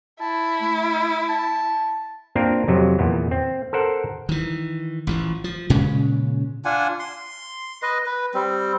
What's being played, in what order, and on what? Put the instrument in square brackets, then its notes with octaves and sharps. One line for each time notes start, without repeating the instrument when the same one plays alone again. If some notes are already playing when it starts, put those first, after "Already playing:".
[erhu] E4 [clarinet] A5
[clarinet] A3
A5
[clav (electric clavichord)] A#3 C4 D4 F4 A#4
F2 C3 F#3
E2 A#2 B3
C4
A4 A#4 C5 F#5
[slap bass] D#3 E3
A1 E3 F3
F3
A#2 C#3 G#3 C#4
[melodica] D4 F4 F#5 G#5
C6
B4 D#5
B4
G3 C4